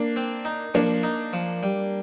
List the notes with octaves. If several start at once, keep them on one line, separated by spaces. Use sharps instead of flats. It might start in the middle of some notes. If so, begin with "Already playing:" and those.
Already playing: A#3 D4
C4
D#4
F3 A#3 D4
D#4
F3
G3